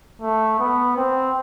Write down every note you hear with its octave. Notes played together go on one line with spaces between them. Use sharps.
A3
B3
C4